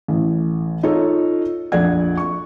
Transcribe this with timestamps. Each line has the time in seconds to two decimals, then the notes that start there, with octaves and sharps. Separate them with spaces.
0.08 A1 A2
0.83 D#4 F4 A4 C#5
1.72 A#1 F2 D5 F#5 G#6
2.17 C#6